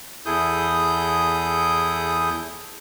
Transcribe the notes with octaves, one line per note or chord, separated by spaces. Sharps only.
E2 E4 G#4 A4 D#6 G6